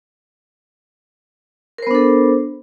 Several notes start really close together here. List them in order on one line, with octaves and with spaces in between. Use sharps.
A#4 C5 B3 D4 A4